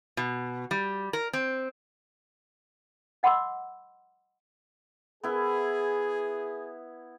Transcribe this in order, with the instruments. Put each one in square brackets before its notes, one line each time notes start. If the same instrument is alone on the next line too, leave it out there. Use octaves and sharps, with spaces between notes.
[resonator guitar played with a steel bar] B2
G3
A#4
C4
[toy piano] D#5 F#5 B5 C6 D6 E6
[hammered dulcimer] B3 E4 [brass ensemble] G#4